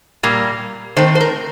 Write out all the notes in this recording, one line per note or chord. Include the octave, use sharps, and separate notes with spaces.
A#2 G3 A#3
D#3 A3 C4 C5
C5
A#4